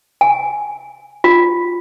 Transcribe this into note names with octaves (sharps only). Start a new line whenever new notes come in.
G#5
F4